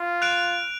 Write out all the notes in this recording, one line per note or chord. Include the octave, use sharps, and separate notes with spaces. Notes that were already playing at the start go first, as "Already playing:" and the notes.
Already playing: F4
F#6 D7 F7